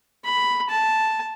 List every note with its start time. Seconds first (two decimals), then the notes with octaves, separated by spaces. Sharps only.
0.25 B5
0.69 A5